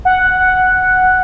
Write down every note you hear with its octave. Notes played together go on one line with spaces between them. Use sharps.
F#5